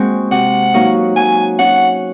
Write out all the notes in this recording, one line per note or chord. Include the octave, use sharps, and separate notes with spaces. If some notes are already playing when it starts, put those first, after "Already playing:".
Already playing: G#3 A#3 C4 F#4
C3 F#5
F#3 A#3 D#4 F#4
F#3 G#5
C#4 F#4 F#5